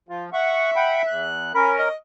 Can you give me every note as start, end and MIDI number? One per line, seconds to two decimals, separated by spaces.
0.09 0.30 53
0.09 0.25 65
0.33 1.31 76
0.33 0.71 78
0.33 0.71 85
0.76 1.02 78
0.76 1.02 79
0.76 1.02 83
1.07 1.53 40
1.07 1.53 90
1.55 1.88 61
1.55 1.88 70
1.55 1.71 83
1.79 1.95 75